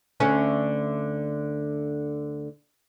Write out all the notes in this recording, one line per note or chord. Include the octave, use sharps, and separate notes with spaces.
D2 D3 C#4